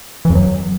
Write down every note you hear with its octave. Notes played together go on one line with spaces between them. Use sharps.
E3
F2
F#3